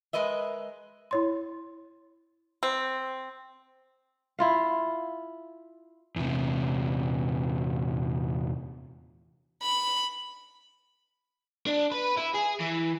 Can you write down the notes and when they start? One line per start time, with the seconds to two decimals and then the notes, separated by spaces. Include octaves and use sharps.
0.13 G#3 A#4 B4 D#5 E5
1.11 E4 C#5 C6
2.63 C4
4.39 E4 F4 F5
6.16 E2 C3
9.62 B5
11.67 D4
11.92 B4
12.17 E4
12.35 G#4
12.61 E3